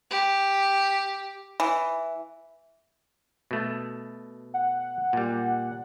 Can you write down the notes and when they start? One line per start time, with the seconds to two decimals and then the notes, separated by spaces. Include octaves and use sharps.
0.11 G4
1.60 E3
3.51 B2 A3
4.54 F#5
5.13 A#2 G3